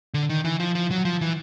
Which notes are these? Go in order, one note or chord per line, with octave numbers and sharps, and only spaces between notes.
D3
D#3
E3
F3
F3
F#3
F3
E3